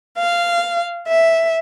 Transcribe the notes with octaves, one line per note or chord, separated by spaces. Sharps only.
F5
E5